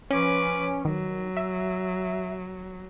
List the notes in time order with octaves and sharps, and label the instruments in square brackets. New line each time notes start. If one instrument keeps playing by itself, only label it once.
[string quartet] F3 B4 D6 [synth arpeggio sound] C#4
[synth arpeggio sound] D#3 [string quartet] F#3
[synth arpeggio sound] E5